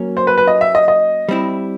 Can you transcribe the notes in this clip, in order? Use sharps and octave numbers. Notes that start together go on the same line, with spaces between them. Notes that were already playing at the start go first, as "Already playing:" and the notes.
Already playing: F#3 A#3 C#4
C5
B4
B4
D#5
E5
D#5
D#5
G3 C4 E4